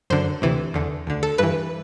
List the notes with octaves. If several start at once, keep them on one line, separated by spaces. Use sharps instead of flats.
F#2 D3 C5
D2 C3 E3
E2 D3
D2 D3
A4
G2 E3 B4